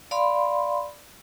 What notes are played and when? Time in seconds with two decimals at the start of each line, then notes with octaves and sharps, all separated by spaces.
0.11 D5 F5 B5 C6